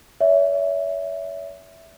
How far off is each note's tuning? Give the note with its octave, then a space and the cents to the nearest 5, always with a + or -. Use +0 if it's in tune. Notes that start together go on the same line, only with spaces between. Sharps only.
C#5 +40 E5 +0